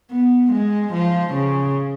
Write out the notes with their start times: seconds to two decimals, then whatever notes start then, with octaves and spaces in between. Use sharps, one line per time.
0.11 B3
0.52 G#3
0.93 F3
1.33 C#3